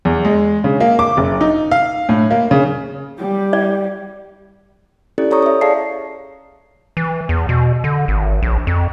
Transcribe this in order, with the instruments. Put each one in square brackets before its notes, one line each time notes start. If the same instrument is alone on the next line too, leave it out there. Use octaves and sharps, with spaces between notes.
[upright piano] E2
G#3
C#3
A#3
D6
F#1
D#4
F5
A2
A#3
C#3
[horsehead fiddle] G3 G4
[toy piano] D5
[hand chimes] C#4 E4 G4 A4 D5
A4 C#5 A#5 C#6 D#6
C#5 E5
G#4 D5 F5 A5 C7
[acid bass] E3
E2
B2
D3
G#1
A#1
F2